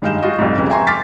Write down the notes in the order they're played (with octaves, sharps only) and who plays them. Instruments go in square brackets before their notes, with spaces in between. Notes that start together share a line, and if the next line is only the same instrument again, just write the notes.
[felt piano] G2 D#3 G#3 F5 G6 E7
F4 F#4 D#5
C2 F2 G#2
F2 C#3 G#4 B4
E5 G5 G#5 A#5 C6 C#6
A#5 C6 D6 F6 A6 B6